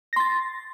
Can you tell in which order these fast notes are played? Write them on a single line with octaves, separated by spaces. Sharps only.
A#6 C6 A6